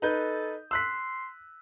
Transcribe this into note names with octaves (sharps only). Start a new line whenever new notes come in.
D#4 A4 B4 G6
C6 E6 F#6 B6